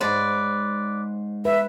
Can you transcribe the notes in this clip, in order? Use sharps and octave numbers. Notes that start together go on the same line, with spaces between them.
G#2 B4 C#5 D5 C6
B4 E5